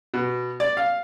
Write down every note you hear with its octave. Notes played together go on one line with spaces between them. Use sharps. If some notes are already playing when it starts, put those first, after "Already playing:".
B2
D5
F5